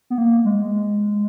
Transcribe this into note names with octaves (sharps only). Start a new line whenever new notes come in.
B3
A#3
G#3